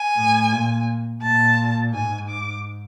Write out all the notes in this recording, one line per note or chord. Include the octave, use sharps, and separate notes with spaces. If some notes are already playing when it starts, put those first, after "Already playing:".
Already playing: G#5
A2
A#2
A#2 A5
G#2 G#5
D6